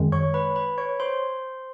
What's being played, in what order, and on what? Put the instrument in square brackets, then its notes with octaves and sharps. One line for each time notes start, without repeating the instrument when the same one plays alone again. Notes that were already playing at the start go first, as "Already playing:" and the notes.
Already playing: [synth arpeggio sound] F#2 D#3 G#3
[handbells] C#5 C#6
B4 B5
B4 B5
C#5 C#6
C5 C6